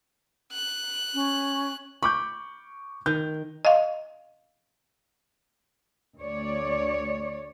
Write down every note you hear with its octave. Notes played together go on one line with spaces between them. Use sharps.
F#6
C#4
B5 C#6 D6 G6
D#3 G6
D#5 F5
D2 C#5 D5